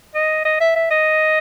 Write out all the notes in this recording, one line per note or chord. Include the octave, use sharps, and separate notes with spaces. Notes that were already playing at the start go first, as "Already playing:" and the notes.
D#5
D#5
E5
E5
D#5